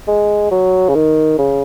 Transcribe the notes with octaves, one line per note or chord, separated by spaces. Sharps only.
G#3
F#3
C#3
D#3
C#3